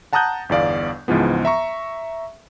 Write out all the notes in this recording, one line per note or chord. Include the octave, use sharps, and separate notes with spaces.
F#5 A5 A#5 D#6 F#6 G6
G1 E2 D5 F5
C#2 G#2 E3 F3 B3
E5 A#5 C#6